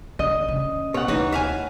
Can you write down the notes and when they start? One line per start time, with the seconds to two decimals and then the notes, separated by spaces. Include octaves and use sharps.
0.19 D3 D#5
0.48 C#3
0.94 B2 C#5 F#5
1.08 D2 E3 D#4
1.32 E5 F5 G#5